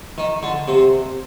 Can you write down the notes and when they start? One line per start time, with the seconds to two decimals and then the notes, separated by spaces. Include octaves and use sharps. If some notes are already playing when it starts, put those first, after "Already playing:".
0.18 D#3
0.43 D3
0.68 C3